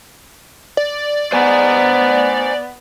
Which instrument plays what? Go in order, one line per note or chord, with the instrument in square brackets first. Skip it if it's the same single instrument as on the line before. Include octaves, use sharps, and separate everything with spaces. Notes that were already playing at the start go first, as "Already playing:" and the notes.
[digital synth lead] D5
[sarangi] B3 [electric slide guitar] C5 G#5 A#5